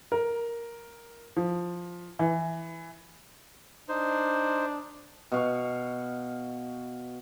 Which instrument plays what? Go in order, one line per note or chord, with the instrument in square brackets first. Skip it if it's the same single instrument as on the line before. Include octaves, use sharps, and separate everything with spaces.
[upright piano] A#4
F3
E3
[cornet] D4 [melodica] D#4 C5
[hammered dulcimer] B2 F5 C#6